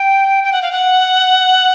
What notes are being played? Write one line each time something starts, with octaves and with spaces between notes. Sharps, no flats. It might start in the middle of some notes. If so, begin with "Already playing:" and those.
Already playing: G5
G5
F#5
F5
F#5